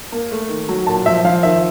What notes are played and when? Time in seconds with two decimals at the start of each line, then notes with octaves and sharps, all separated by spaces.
0.12 A#3
0.31 A3
0.49 D#3
0.69 F#3
0.87 A#2 A5
1.06 F3 E5
1.24 F3 F5
1.43 D#3 E5